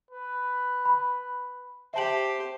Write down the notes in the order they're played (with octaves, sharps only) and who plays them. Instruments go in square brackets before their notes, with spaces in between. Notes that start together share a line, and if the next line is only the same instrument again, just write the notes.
[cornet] B4
[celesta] B5
[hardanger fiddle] G4 C5 [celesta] E5 A5 F#7